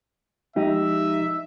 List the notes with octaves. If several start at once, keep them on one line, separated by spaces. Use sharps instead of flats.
F3 G#3 D#4 G4 E5